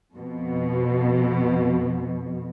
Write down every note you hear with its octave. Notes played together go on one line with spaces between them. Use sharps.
F2 B2